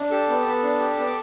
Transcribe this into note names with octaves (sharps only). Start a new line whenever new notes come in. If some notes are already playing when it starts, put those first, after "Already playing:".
Already playing: D4
G4 A4 A5
B3
B3
D4
G4
B3
D6